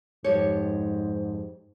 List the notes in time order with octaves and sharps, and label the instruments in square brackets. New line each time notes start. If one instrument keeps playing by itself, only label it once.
[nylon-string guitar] F2 G3 C#5 [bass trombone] G#2